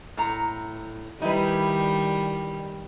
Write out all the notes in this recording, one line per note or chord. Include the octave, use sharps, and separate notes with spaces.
A2 A#5
D#3 G3 D#4 E4 B4